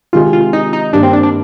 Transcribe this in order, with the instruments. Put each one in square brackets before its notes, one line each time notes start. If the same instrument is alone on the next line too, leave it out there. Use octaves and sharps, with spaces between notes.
[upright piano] C3 D#3 G#3 [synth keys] F4
[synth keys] F4
D#4
D#4
[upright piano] G2 D#3 A#3 [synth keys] D4
[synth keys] C4
D4
D4